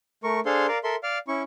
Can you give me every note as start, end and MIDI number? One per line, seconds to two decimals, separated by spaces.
0.24 0.40 57
0.24 0.40 70
0.24 0.40 85
0.46 0.67 62
0.46 0.67 68
0.46 0.67 69
0.46 0.67 72
0.46 0.67 77
0.46 0.67 84
0.68 0.78 70
0.68 0.78 74
0.68 0.78 77
0.84 0.96 69
0.84 0.96 70
0.84 0.96 76
0.84 0.96 84
1.03 1.18 74
1.03 1.18 77
1.03 1.18 89
1.28 1.43 61
1.28 1.43 64
1.28 1.43 85